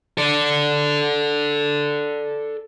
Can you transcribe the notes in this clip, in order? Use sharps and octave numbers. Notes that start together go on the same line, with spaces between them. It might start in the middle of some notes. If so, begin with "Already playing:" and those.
A4 D5